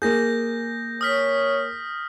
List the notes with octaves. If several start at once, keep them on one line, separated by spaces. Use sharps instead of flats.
A#3 G#4 G6 A#6
C#5 D#6 F6 B6